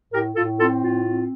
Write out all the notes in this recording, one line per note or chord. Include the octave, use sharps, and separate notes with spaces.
A2 G4 A#4
A2 F4 A4
C4 F4 A4
A2 F4
C4